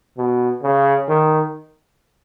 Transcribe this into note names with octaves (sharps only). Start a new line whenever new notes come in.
B2
C#3
D#3